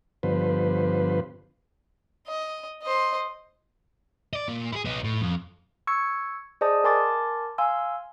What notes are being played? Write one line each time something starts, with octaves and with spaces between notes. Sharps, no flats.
G2 D3 F3 B3 B4 C5
D#5
C5 D#5
D5 D#5
A#2
E4 G#4
B3 D#4
A2
F2
C#6 E6 G#6 C#7
G#4 C5 D5 D#5 A5 D#6
A#4 G#5 A5 C6 D6 A6
F5 G#5 C6 E6